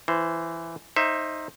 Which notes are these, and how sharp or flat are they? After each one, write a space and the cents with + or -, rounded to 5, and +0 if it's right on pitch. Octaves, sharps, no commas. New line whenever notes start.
E3 +10 C5 +0
D#4 +0 C5 +20 E5 +10